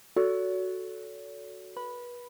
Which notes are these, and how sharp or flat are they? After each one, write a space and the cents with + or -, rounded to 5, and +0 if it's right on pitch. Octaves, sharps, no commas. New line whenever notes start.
F#4 +0 A4 +0 C#5 +45
B4 -30 B5 +0